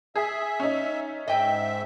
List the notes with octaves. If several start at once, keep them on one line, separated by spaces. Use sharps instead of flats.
G#4 E5
C#4 D#4
G#2 D#5 E5 G5